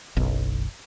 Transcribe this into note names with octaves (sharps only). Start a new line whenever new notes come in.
F#1 B1